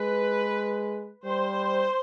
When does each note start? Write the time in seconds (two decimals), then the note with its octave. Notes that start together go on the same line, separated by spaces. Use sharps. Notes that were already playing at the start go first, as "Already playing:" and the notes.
Already playing: G#3 B4
1.25 G3 C5